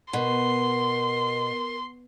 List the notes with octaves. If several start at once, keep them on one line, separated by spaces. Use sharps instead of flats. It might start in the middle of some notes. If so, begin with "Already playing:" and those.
B2 A#4 C6